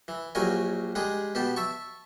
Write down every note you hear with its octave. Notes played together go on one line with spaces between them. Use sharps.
E3
A#1 F#3 G3 A#4 C#5 G#5
G3 G#3 D4 G#4
B2 B3 G4 A5
E5 A5 C#6